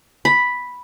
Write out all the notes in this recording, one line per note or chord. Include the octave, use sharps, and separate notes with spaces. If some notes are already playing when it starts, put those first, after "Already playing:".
B5